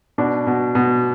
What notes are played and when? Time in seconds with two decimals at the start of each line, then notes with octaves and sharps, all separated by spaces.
0.18 B2 D4
0.47 B2
0.75 B2